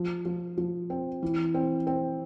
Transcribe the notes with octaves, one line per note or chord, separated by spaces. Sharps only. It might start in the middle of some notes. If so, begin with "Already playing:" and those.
Already playing: F3
F3
F3
C4
E3
C4
C4